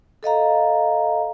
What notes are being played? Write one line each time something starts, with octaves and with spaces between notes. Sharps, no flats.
A4 D#5 F5 A#5